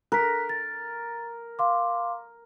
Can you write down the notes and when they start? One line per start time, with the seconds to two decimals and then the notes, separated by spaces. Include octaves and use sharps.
0.12 A#4 F#6 B6
0.49 A6
1.59 F5 C6 D6